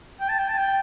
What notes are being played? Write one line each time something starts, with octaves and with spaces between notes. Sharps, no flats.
G5
A5
G5
A5
G5